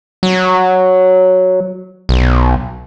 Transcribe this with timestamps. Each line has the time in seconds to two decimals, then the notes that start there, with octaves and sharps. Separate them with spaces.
0.23 F#3
2.09 B1